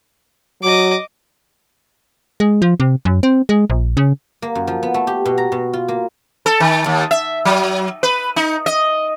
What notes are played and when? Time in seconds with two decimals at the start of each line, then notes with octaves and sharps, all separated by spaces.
0.63 F#3 D#5 D6
2.40 G#3
2.62 F3
2.80 C3
3.05 F#2
3.23 C4
3.49 G#3
3.70 A#1
3.97 C#3
4.42 A#3
4.55 F#2
4.67 F3
4.83 B3
4.94 A3
5.07 G4
5.25 B2
5.38 A#5
5.52 B2
5.73 F4
5.88 A#3
6.46 A4
6.60 D#3
6.86 D#2
7.11 E5
7.45 F#3
8.03 B4
8.36 D#4
8.66 D#5